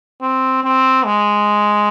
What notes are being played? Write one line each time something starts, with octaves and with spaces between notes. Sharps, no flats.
C4
C4
G#3